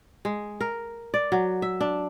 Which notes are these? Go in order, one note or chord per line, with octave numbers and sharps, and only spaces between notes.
G#3
A#4
D5
F#3
E5
D4